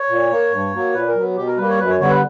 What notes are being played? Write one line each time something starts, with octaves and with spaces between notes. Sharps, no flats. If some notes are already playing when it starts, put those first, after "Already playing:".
Already playing: C#5
A#2
A#3
G2
F#3 A#3
A#2 B4
A#4
F#3 B3
B2 G4
A#4
G3 A#3 B4
C#5
F#2 B4
C#5
D3 G3 B3 C#5
B4